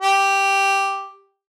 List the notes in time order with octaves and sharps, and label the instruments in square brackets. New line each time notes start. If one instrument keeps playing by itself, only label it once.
[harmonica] G4